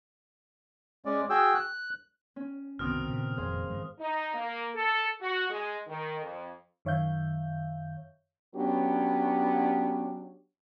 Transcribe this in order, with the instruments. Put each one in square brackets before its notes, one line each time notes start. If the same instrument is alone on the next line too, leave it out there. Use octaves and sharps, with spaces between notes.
[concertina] G#3 C#4 D5
F#4 G#4 G5 E6
F#6
[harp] C#4
[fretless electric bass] F#1 C2 [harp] B2 D#3 C4 [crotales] D#6 F6
[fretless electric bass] A#2 C#3
[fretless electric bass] F1 F2 A#2 [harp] G#4 C5 F5
[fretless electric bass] G2 E3 G#3
[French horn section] D#4
A#3
A4
F#4
G#3
D#3
F2
[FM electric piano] F#2 D#3 C#5 E5 F5 G6
[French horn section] F#3 B3 C#4 D4 G4